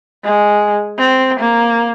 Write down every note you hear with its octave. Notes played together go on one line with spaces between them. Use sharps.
G#3
C4
A#3